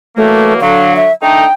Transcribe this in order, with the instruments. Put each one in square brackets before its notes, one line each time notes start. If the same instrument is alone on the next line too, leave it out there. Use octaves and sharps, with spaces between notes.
[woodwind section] E3 F#3 A#3 [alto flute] A3
[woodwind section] D3 F#3 [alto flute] F5
[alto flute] E5
[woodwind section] A3 D4 D#4 [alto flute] G5